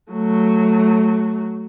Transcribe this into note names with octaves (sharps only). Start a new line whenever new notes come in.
F#3 A3